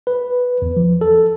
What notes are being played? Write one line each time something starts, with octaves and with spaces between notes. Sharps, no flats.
B4
E2
F3
A4